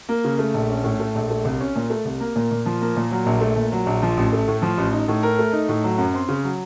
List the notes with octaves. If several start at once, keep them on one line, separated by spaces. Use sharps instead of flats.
A#3
C#3
A3
A#1
C#4
A2
A3
A#1
A3
C2
C#4
A#2
A3
C2
A#3
A#2
A#2
F3
A#3
A#2
F#3
A#1
A3
A#2
F#3
A#1
F3
A1
A3
A2
F3
A1
D#4
A2
A#4
A3
D#4
A2
F#3
F#2
C4
C#3
F#3